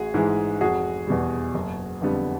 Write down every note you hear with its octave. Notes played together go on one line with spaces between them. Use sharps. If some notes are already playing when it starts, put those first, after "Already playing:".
Already playing: A1 F#4 G#4
G#2 E3 G#3
F1 F#4 G#4
E2 B2 G3
F#1
F2 D3 G3 B3